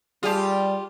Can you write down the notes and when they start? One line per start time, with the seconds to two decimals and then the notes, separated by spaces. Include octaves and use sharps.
0.23 G3 F4 G4 G#4 G#5 A5